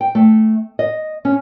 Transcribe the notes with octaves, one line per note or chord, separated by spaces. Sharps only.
G5
A3
D#5
C#4